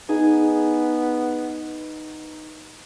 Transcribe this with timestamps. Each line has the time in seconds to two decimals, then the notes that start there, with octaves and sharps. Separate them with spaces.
0.09 B3 D#4 G#4